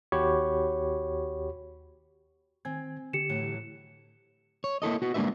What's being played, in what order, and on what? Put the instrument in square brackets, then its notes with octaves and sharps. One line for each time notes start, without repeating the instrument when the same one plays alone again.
[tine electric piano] D#2 F#4 G4 C#5 B5 C#6
[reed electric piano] D#3 G#5 G#6 [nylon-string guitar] C4
[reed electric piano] D3 G4 [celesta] C#7 E7
[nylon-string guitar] A2 E3 F#3
[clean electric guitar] C#5
A#3 E4 A4 D#5
B3 F#4
G#3 A#3 D4 F#4 B4 E5